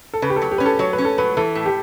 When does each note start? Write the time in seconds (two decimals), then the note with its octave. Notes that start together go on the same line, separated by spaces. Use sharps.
0.14 A4
0.22 C#3 B4
0.30 G4
0.36 A4
0.42 F#3
0.51 G4
0.58 C#4 B4
0.66 A4
0.79 F#3 C#5
0.93 B4
0.98 C#4
1.05 A4
1.18 F#3 B4
1.37 E3 A4
1.55 A2
1.66 G4